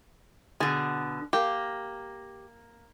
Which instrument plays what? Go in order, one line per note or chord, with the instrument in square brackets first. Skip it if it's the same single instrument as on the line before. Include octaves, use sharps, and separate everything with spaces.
[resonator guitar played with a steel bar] B2 D3 [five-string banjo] G#4
[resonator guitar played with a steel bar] A#3 [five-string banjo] G4